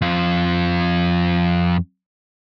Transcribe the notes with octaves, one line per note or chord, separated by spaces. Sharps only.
F2 F4